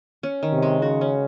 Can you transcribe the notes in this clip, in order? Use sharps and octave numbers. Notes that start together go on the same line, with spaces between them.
C#4
D#3
C3
G#3
C#3 F#4
C#4